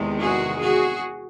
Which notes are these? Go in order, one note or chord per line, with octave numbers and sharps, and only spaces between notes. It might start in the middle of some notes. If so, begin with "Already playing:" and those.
Already playing: E2 C3 D#3 G#3
F#4 G#4
F#4 G#4